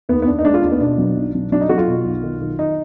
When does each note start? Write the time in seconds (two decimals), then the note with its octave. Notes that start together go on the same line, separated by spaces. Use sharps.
0.09 D#2 B3
0.22 B3
0.27 D#2 D4
0.39 D#4
0.45 G#3 D4
0.54 F4
0.62 D#2 D4
0.72 B3
0.80 B2 D4
0.98 F#3
1.16 B1
1.34 F#3
1.52 F#3 D4
1.61 D#4
1.69 F#3 F#4
1.78 F4
1.87 B2
2.05 B1
2.23 D#3
2.41 D#3
2.59 D#3 D#4